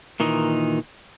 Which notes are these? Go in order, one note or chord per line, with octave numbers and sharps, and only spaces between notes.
A#2 D#3 E3 D#4